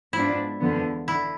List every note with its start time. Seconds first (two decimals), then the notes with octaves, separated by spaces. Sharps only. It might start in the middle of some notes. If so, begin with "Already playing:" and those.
0.13 G#2 F3 B3 D4 E4
0.61 E2 D3 F3 B3
1.08 D3 E4